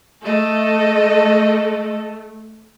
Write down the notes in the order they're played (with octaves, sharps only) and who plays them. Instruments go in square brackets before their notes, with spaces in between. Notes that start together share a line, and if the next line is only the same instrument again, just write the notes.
[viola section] A3 [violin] A4 D#5